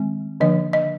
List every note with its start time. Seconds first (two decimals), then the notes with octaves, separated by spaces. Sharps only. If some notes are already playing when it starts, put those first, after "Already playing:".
Already playing: D#3 G#3 C4
0.40 D3 F3 A#3 D4 D#5
0.73 D#5